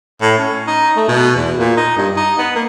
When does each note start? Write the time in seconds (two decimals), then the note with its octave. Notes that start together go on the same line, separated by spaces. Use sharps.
0.21 A2
0.38 C#4
0.67 D#4
0.97 A3
1.08 B2
1.36 E2
1.57 A#2
1.77 D#4
1.97 G2
2.17 D#4
2.38 B3
2.55 A#3